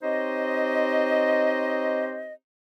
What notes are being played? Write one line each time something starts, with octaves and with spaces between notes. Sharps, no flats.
C4 D#4 G4 C5 C#5 D#5